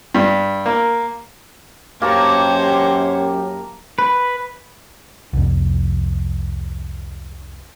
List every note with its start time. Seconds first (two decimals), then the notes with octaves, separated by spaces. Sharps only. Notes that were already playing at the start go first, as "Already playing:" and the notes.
0.14 G2
0.66 A#3
2.02 F#2 A#3 G4 C5 C#5 A5 A#5
3.99 B4
5.33 C2 F2